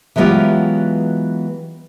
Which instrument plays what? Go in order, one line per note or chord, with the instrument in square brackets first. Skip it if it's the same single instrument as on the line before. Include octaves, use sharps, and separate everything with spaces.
[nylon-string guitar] E3 F#3 G#3 B3 F4 G4